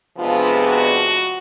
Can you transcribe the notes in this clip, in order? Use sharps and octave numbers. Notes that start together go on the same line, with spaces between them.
C3 F3 G#3 B3 D4 F4
F#4